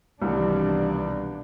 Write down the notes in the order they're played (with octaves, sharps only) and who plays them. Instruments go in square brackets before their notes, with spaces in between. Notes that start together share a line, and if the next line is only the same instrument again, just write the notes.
[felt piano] C2 [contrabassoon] G2 [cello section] B2 D#3 E3 [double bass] D4